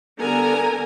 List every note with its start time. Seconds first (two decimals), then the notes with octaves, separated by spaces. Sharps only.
0.19 D3 G3 B3 A#4 G#5 A#5